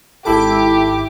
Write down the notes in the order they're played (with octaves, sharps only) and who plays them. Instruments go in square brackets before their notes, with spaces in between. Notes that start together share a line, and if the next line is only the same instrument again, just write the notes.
[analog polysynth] G#1 E4 D6 [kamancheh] G4 [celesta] A4 A5 B5